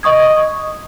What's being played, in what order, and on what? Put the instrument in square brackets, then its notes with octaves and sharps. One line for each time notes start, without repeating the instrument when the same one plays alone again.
[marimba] D#5 C#6 D#6 G#6